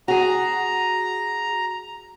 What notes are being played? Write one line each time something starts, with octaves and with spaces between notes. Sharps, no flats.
F#4 G#4 A#5